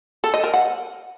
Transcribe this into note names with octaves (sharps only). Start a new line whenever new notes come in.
A4
D#5
A#4
F#5